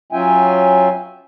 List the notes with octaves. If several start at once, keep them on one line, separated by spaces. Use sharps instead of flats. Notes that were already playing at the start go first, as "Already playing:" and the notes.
F#3 C#4 F4 E5 G5 G#5